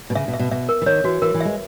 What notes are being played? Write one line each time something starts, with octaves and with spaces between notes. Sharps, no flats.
B2
C#3 E5
B2
E5
B2
B2 E5
A#4
E3
D#3 C#5
E3 F#4
E3 A#4
E3
G#3 E5